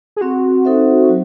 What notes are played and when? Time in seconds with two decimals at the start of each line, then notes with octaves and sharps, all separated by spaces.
0.16 G#4
0.21 C4 F#4
0.65 D#4 A4 C5 E5
1.09 F#3